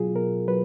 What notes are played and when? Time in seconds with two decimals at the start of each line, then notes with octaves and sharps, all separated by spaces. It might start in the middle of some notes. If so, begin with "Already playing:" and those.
Already playing: B2 F#3 F4 G#4
0.15 B2 A#4
0.48 F#3 B4